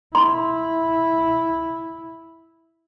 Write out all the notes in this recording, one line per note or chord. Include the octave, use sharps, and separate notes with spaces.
E4 C6